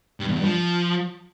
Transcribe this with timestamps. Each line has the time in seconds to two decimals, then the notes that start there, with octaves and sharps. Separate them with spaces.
0.20 G2
0.28 E2
0.36 G2
0.44 F3